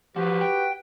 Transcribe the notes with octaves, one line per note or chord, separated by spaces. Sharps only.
F3 F#3 F#4 G4 B4
G5